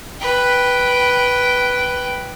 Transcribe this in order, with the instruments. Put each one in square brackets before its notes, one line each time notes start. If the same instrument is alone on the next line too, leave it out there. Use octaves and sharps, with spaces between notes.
[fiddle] B4 G5